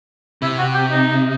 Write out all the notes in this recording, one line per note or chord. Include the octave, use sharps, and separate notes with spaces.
C3 E4
F#4
G4
D#4